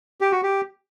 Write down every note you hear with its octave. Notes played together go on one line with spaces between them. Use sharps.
G4
F#4
G4